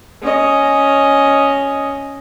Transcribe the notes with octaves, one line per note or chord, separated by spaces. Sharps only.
C#4 D#5